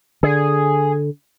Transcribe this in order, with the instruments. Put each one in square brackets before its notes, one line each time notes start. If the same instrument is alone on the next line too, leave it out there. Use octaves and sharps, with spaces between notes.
[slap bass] D3 [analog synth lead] G#4